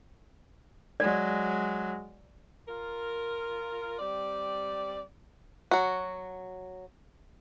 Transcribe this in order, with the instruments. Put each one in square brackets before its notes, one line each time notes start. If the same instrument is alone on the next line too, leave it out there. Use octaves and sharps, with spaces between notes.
[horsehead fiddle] F#3 G#3 [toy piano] D5
[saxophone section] F4 A#4
G3 C4 D5
[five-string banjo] F#3 F#4